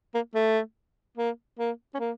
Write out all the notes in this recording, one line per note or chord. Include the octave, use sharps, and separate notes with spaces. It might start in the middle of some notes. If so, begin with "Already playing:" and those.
A#3
A3
A#3
A#3
C#4
A#3